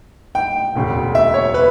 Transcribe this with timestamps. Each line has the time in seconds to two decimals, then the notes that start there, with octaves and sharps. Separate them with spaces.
0.35 G5
0.75 E1 D2 C#3
1.15 E5
1.34 C#5
1.54 B4